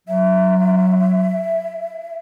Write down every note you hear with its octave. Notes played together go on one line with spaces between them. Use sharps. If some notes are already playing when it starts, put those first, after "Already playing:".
F#3 E5